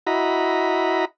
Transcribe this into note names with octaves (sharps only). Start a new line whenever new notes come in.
E4 F#4 D#5 A#5 B5